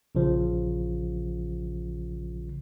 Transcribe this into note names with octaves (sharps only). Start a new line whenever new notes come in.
A#1 C#3 F3